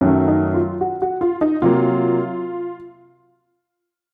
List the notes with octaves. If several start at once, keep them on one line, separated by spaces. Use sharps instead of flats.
F#2 D#3 F#3 A3 C#4
D#4
F4
F#4
F#4
F4
D#4
C3 F#3 A#3 F4